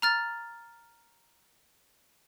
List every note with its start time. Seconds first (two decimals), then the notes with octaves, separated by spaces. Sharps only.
0.02 A#5 F6 A6